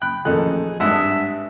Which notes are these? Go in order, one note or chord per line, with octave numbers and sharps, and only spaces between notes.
F#1 G5 B5 F#6
A1 F2 A#2 D#3 D#4 G#4 A4 F#6
G#1 G2 G#3 E5 F#5 A5 D#6